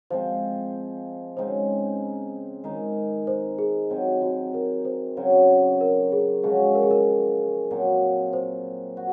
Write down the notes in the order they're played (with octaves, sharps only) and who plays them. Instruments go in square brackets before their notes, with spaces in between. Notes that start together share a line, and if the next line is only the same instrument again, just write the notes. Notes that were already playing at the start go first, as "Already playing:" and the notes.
[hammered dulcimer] F3 G#3 C4 [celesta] C5
[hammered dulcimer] C#3 G#3 C4 D#4 [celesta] C5
[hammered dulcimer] D#3 G#3 D#4
[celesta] C5
G#4
[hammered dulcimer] C3 F#3 C4
[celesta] F#4
A#4
C5
[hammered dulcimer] C#3 F#3 C4
[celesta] A#4
G#4
[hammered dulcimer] F3 G#3 C#4 F#4 [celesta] G#4
[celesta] A#4
G#4
A#4
[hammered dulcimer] A#2 F#3 C4
[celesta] C5
[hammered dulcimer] F#4